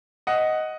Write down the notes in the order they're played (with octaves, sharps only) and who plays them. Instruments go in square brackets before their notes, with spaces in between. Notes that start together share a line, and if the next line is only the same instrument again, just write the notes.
[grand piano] D#5 F#5